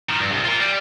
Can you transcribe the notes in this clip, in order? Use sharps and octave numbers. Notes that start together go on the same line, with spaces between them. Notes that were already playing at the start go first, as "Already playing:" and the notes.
D#3 F3
G2
C2
F4 A#4
G3